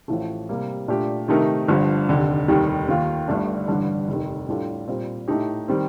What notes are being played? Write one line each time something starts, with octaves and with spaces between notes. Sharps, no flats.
A1 A2 F3 A3
C3 G3 A#3
A#2 A3 D4 G4
C3 D#3 A3 D#4 A#4
G1 G2 D3 F3
F1 D#2 D3
F1 D#2 D#3 G3
D#2 D#3 A#3 F4
G1 G2 D3 A3 D4
A1 G2 D3 G3 D4
F1 D#2 D#3
A2 G3 D4 F4 A4
A#2 G3 C4
A2 A3 D#4 G4
D#3 G3 C4